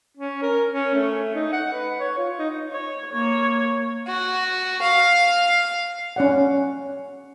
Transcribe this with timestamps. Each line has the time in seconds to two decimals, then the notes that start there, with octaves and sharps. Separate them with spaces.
0.17 C#4
0.42 A#4
0.70 C#4
0.95 A3
1.35 D#4
1.53 F#5
1.73 B4
2.00 C#5
2.18 F4
2.38 D#4
2.72 C#5
3.13 A#3 C#5
4.07 F#4
4.82 F5
6.16 C#4 D5 F#5